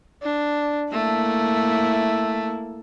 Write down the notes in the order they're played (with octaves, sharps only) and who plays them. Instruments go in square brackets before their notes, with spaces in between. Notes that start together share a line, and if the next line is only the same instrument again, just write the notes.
[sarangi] D4
[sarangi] A3 [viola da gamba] A#3 E4